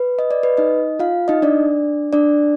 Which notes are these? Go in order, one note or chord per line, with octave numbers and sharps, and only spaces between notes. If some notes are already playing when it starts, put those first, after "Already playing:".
Already playing: B4
D#5
D5
B4
D#4 D#5
F4 F5
D#4 D#5
D4 D5
D4 D5